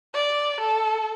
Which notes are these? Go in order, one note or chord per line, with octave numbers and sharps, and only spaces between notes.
D5
A4